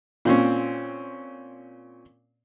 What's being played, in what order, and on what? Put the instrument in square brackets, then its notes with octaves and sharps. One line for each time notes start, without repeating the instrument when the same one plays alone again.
[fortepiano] A#2 C4 C#4